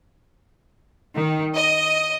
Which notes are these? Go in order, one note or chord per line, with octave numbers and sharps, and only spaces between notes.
D#3
D#5